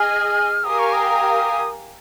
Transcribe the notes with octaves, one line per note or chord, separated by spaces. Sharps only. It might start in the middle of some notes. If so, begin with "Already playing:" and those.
Already playing: G#4 D#5 G#5 F6
G4 A#4 F5 G#5 D#6
C#6
D#6